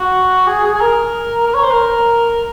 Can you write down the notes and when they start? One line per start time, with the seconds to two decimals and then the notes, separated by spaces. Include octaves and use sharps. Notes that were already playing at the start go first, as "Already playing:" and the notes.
Already playing: F#4
0.47 G#4
0.64 G#4
0.75 G#4
0.80 A#4
1.47 A#4
1.54 C#5
1.63 C5
1.71 A#4